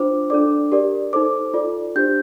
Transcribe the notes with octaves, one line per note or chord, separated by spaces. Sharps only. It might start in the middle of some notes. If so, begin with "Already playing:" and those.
Already playing: D4 F4 C5 D6
D4 A4 D5 D6
G4 A#4 D5
D#4 A4 C5 D6
F4 A4 D5
D4 G4 C5 G6